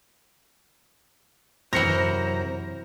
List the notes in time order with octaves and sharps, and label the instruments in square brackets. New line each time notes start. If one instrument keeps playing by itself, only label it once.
[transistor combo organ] F#2 C3 A#5 [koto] E3 A#4 [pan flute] C5 [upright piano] A#6 C#7